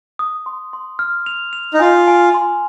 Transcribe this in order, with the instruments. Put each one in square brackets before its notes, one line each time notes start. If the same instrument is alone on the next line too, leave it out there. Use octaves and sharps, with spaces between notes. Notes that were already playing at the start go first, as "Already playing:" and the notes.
[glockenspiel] D#6
C6
C6
F6
F7
F7
[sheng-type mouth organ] D#4
[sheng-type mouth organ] F4 [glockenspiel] G#5
[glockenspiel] G#5
C6